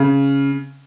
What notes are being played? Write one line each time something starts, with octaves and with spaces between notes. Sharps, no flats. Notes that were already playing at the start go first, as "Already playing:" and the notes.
Already playing: C#3